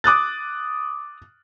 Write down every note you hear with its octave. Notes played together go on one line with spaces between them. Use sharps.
D6 D#6 F#6 A6